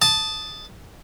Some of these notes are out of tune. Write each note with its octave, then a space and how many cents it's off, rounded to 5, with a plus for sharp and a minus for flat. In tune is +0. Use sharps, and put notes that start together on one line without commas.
A5 +0 D#6 +0